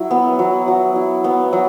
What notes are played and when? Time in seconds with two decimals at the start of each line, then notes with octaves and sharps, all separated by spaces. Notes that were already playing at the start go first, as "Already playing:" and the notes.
Already playing: F#3 E4
0.11 B3
0.39 F#3
0.68 F#3
0.96 E4
1.24 B3
1.53 F#3